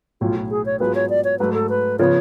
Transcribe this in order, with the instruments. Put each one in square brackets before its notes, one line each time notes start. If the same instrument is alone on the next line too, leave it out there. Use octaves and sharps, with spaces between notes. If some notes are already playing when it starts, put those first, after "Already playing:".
[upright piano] B1 A2 F#3 [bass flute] F4
[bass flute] G#4
C#5
[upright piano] G#2 F#3 B3 F4 G#4 [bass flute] B4
[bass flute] C#5
D5
C#5
[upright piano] G#2 F#3 A3 [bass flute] B4
[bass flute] A4
B4
[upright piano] C#3 F3 B3 F4 [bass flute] C#5